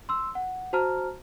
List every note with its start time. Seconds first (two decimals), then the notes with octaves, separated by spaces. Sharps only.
0.09 C6 E6
0.35 F#5
0.73 F#4 C5 A5 A#5 F6